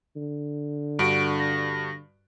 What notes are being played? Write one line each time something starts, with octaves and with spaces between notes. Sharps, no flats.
D3
G2 F#4 D7
A#6